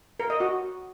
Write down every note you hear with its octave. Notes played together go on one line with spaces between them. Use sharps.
A#4
D#5
F#4